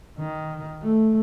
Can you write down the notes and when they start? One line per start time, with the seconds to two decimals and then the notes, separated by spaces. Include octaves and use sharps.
0.19 D#3
0.83 A3